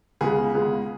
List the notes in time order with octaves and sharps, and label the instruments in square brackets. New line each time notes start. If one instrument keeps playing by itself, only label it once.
[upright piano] C#2 C#3 G#3 B3 G#4
C#2 C#3 G#3 B3